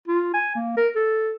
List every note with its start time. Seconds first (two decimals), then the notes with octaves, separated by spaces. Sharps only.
0.08 F4
0.34 G#5
0.55 A#3
0.77 A#4
0.95 A4